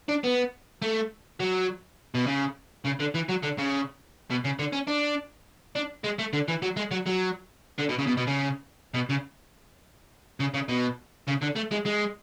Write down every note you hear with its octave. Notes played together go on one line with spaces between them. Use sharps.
D4
B3
A3
F#3
B2
C#3
C#3
D3
E3
F#3
D3
C#3
B2
C#3
D3
C#4
D4
D4
G#3
A3
D3
E3
F#3
G#3
F#3
F#3
D3
B2
C#3
B2
B2
C#3
B2
C#3
C#3
C#3
B2
C#3
D3
A3
G#3
G#3